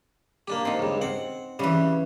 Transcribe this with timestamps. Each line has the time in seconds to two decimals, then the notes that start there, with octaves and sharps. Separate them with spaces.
0.48 A#3 D4 G4
0.65 C4 D#4
0.79 C#2 G2
1.01 C4 F#5
1.59 C#3 E3 G3